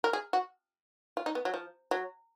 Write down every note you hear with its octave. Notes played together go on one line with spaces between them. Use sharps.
A#4
G#4
F#4
F4
D#4
B3
F#3
F3
F#3